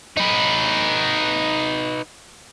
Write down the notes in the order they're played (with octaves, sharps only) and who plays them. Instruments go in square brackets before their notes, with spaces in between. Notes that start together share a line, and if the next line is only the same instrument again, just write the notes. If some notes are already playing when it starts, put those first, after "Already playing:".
[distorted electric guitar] D#4 B4